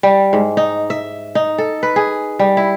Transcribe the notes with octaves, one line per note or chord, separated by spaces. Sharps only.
G3
G#2
D#4
E5
D#4
A4
B4
G#4
G3
E4